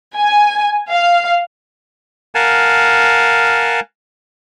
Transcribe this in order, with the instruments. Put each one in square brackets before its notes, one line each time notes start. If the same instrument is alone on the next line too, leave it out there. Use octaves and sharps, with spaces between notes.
[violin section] G#5
F5
[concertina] A#4 F5 F#5 G#5 A5